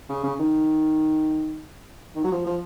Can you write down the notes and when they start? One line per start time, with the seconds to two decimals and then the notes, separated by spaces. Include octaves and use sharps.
0.09 C#3
0.23 C#3
0.39 D#3
2.15 D#3
2.24 F#3
2.31 F3
2.46 F3